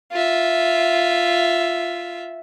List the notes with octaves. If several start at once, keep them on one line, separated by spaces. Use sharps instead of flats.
F4 E5